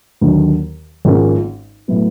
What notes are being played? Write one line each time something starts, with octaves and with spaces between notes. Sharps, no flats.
D#2 D3 F#3
G#1 G#2 F3 A#3 C#4
A2 F#3 B3